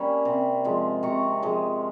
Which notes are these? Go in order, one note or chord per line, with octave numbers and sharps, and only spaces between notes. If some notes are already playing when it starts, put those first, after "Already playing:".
Already playing: G3 A#3 C#4 G#5
C3
F3 G#3
C3 A#5 C#6
F3 G#3